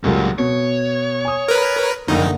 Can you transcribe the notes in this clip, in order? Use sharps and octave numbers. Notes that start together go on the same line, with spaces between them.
C#2 A2 F#3 G3 A#3
B2 C#5
G#5 D#6
A#4 B4
F#1 C2 F2 D3 A#3 D#4